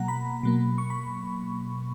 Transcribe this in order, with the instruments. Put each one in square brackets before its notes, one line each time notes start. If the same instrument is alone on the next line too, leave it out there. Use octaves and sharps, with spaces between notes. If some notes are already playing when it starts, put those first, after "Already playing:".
Already playing: [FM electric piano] B2 F#3 A#3 F#5 A#5
B5
B2 F#3 A#3
C#6
B5